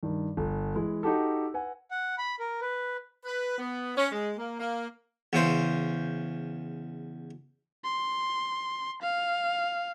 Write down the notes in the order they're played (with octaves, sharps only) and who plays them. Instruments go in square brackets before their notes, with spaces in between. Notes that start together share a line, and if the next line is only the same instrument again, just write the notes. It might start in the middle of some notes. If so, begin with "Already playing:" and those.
[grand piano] G2 D#3
G1
E3 G#3
D#4 F#4 G4 A4
B4 F#5 G#5
[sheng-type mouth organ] F#5
B5
A#4
B4
[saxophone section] B4
B3
C#4
G#3
A#3
A#3
[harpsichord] E2 C#3 C5
[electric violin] C6
F5